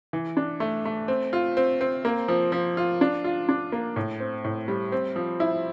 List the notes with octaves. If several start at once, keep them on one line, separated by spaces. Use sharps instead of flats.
E3
D4
A3
A3
C4
F4
C4
C4
A#3
F3
F3
F4
D4
F4
D4
A#3
A2
C4
A2
G3
C4
F3
E4